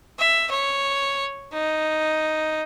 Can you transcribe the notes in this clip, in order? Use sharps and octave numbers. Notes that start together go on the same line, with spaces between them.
E5
C#5
D#4